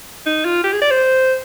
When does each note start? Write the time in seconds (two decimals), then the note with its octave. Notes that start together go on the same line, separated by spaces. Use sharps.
0.26 D#4
0.45 F4
0.64 G4
0.72 G#4
0.82 D5
0.91 C5